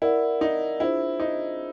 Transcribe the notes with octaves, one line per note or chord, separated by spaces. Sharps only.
E4 A#4 D5 F#5
D#4
D4 E4 F4 G#4 C5
D#4